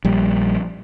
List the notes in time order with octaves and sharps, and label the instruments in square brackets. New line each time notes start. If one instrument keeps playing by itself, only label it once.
[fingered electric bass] A#1 G3